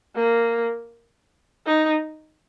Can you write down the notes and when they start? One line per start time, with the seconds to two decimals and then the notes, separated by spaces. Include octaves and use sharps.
0.16 A#3
1.66 D#4